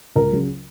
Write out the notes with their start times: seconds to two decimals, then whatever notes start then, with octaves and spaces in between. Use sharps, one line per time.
0.16 C#2 A#4
0.32 C#3 F#3